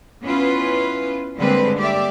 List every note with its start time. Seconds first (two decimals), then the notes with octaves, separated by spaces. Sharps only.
0.23 B3 C#4 E4 F4 B4
1.38 D3 G3 G#3 A#3 C4 B4
1.79 A#3 G4 D5 E5